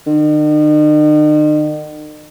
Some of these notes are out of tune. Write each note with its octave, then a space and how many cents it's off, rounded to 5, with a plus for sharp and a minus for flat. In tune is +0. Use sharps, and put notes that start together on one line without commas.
D#3 -45